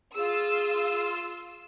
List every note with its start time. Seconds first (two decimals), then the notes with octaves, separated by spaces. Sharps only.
0.15 F4 G#4 E6